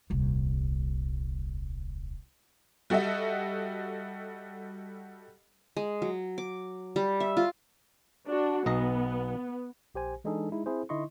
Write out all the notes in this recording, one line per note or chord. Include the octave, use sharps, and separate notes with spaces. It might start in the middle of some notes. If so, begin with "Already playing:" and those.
D#1 C2
G3 F#4 A4 D#5 E5
G#3
F#3
D6
G3
E5
F4
D4 F#4
B1 B3 D#5 A#5
A#1 G4 C5 G#5
E3 G#3 D4 D#4 G#4 A4
G#3 D#4 E4
C4 E4 G#4 C5
D3 D#4 E4 D#5 C6 C#6